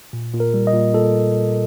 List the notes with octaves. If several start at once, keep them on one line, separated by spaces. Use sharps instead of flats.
A#2
A#2
A#4
G3
D#5
A#2
A#2 A4